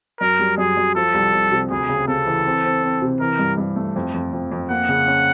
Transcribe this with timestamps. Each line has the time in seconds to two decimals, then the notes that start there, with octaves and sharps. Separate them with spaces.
0.20 F#2 A#4
0.39 G3
0.58 F#2 G#4
0.77 F#2
0.95 F3 A4
1.14 C2
1.33 C2
1.51 C3
1.70 D2 G#4
1.89 C#3
2.08 C#3 A4
2.27 E3
2.45 C4
2.64 C4
2.83 C4
3.02 C3
3.20 E3 A#4
3.39 G2
3.58 G2
3.76 A3
3.96 F2
4.14 F2
4.33 F2
4.51 F2
4.70 A#3 F#5
4.89 C#3
5.08 C#4